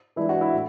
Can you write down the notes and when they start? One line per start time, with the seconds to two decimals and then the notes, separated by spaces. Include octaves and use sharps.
0.16 E3 G#3 D4 E4
0.29 F#4
0.41 E4
0.53 A2